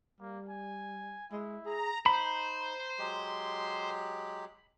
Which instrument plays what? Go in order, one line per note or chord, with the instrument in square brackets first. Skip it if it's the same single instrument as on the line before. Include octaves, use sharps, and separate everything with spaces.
[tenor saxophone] G3 [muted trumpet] A#3
[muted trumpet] G#5
[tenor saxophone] G#3 [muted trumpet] E4
[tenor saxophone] G#4 [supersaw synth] A#5
[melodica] D#4 [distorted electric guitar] C5 [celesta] A#5 [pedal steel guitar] B5
[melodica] F#3 G#3 G4